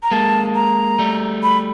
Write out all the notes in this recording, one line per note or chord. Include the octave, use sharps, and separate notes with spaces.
A#5
G#3 A#3 A5
A#5
G3 A3
B5